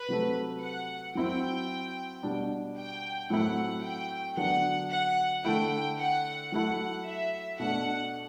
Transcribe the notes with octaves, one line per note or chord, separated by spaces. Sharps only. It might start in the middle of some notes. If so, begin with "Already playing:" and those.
Already playing: B4
C3 F#3 A3
F#5
F#3 C4 E4 G5
B2 G3 D4
G5
A2 F#3 A3 C4 E4 F#5
G5
D3 F#3 B3 D4 F#5
F#5
D3 A3 E4 G5
F#5
F#3 A3 E4 F#5
E5
B2 A3 D4 F#5